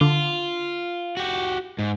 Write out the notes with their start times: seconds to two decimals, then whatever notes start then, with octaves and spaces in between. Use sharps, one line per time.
0.01 D3 F4
1.17 F#4 G4
1.79 G#2